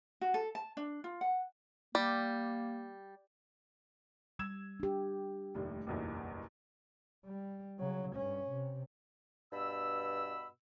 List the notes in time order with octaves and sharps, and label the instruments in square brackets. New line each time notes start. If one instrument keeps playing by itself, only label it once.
[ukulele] F#4
A4
A5
D4
F4
F#5
[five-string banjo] G3 [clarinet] A#3
[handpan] G3 [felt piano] E6 G#6 E7
[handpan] D4 G4
[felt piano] F1 D#2 A2
F#1 B1 E2
[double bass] G3
C#3 F#3
G2 C#4
C3
[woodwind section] G2 B2 B5 E6